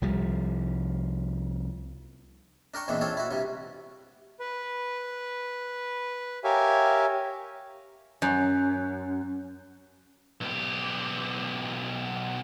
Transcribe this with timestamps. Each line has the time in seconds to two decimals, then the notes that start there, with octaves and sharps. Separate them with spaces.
0.02 C2 F3 G3
2.74 D4 A#4 G5 C#6
2.88 E2 A#2 D#3 E3 C4 D4
3.01 C4 D4 F4 A4 C#5
3.17 E4 F#4
3.31 G2 C3 G3
4.40 B4
6.44 G4 A#4 C#5 E5 F5 G#5
8.22 F#2
10.41 B1 G4